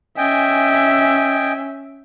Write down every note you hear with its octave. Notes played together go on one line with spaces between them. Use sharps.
C#4 D#5 E5 G5 G#5